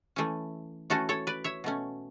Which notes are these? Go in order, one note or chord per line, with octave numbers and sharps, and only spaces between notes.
E3 A3 C#4
E3 A3 C#4 F#4 A4
A4 C#5
B4 D5
C#5 E5
B2 A3 C#4